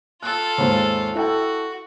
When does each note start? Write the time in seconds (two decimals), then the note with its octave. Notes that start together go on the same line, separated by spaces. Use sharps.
0.23 F4 A4 F#6
0.58 D#2 G#2
1.15 E4 F#4 A4 G5